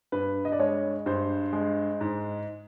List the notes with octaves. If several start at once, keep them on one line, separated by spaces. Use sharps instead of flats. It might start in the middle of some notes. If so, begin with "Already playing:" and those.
G2 B4
D#5
D5
G#3 C#5
G2 C5
G#3
G#2